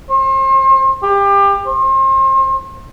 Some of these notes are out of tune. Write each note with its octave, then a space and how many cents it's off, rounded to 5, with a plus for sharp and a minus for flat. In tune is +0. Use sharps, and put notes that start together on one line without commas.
C5 +40
G4 +25
C5 +35